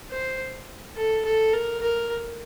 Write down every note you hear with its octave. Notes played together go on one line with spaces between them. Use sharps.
C5
A4
A4
A#4
A#4